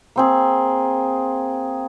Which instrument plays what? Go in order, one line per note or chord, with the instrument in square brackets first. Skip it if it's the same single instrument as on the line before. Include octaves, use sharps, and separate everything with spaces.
[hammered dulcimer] A#3 C4 G#4